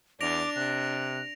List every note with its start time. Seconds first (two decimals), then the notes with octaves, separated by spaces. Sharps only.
0.21 E2 D4 D6 A#6 D7 F7
0.56 C3 F#6